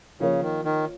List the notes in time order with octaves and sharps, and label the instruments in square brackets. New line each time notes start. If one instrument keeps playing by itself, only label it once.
[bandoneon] C#3 [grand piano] F3 A#3 F4 A#4 C#5
[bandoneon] D#3
D#3